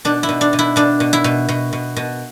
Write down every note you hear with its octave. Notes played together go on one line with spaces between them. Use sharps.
B2 D4
E4
B2
D4
B2
E4
B2 D4
B2
E4
B2
B2
B2
B2